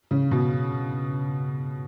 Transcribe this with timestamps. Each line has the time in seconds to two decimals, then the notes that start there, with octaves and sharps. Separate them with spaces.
0.11 C#3
0.31 B2